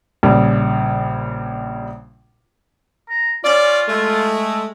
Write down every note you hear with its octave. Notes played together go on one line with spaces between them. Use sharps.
A#1 C#3 G3
A#5
C#4 F4 D5
G#3 A3